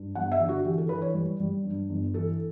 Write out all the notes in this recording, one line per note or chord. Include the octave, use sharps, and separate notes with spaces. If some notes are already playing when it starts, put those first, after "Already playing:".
Already playing: G2
G1 F#5
E5
D3
F#4
E3 G4
A4
E3 B4
C#5
G3
G3
G2
G1
E3 A4